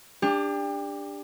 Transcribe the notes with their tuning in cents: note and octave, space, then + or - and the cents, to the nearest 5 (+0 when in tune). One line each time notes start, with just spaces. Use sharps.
D4 +0 G4 +30